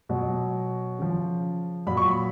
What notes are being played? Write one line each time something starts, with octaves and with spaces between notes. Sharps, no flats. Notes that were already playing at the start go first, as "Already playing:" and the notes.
B2 F#3
C#3 F3
A#2 F#3 B5
C#6
B5